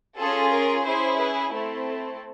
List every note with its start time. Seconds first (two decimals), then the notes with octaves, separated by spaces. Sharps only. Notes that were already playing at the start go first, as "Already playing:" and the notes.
0.18 C#4 F4 G#4 A4
0.51 A#4
0.85 C#4 E4 G#4 C5
1.17 B4
1.51 A3 C4 E4 A4